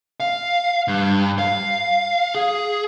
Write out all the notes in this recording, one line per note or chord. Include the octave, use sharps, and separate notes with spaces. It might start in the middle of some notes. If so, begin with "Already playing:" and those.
F5
G2
F5
G#4